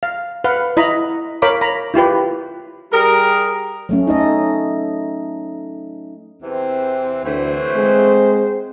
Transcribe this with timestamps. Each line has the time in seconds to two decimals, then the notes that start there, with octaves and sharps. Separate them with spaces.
0.03 F5
0.44 B4 F5 F#5
0.77 E4 D#5 A#5 B5
1.42 A#4 C#5 F5 B5 D6
1.61 A#5 B5
1.94 E4 F4 G4 B4
2.93 G3 G4 G#4 A#4
3.89 F#3 A3 C#4
4.07 D#4 A4 D#5
6.42 E2 C3 E3 C4
7.25 D2 E3 F#3 A3 C5
7.75 G#3 C4